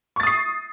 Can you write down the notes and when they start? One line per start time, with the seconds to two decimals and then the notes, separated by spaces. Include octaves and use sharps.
0.16 C#6
0.20 A6
0.23 D#6
0.27 C7